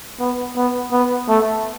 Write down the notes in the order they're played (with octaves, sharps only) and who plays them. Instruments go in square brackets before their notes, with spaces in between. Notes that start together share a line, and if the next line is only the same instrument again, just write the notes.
[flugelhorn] B3
B3
B3
A3